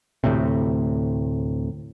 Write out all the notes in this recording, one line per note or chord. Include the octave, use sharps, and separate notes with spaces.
D2 A2 C3